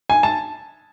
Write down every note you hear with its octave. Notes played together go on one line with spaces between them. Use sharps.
G#5
A5